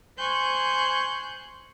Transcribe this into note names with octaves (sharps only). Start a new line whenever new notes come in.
C5 G#5 C6 C#6 F#6 G6